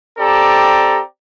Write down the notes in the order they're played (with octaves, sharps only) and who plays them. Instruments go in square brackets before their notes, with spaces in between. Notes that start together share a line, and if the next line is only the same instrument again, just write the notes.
[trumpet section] C4 G4 A4 D5 A#5